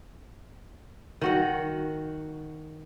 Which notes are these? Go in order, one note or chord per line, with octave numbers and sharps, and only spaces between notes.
D#3 F#4 F#5